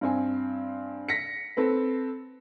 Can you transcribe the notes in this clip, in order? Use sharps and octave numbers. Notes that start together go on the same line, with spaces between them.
G2 C4 G#5
A#6 B6 C#7
C4 A4 B4